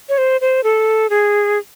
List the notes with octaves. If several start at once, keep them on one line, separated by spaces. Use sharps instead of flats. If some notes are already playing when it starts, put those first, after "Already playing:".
C#5
C5
C5
A4
G#4